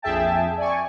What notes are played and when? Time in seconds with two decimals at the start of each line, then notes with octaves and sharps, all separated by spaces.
0.02 A#1 F2 G#4 E5 G5 A5
0.57 D5 G#5 C#6